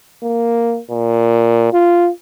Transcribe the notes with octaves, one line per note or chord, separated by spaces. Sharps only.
A#3
A#2
F4